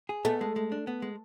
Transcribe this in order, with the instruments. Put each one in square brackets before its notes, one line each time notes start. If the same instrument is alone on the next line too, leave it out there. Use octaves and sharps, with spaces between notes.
[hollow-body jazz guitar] G#4
[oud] A3 [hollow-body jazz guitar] B3
[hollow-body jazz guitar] G#3
G#3
D4
B3
G#3